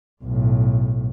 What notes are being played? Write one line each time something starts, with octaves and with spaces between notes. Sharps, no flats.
B1 A2